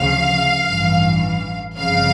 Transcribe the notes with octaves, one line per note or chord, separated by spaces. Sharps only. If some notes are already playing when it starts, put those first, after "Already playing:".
Already playing: D2 C#3 F3 F5
A1 G2 E3
G1 F2 C#3 F5